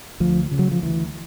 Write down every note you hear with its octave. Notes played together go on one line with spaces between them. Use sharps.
D2 F3
C#3
F#3
F3
D2 E3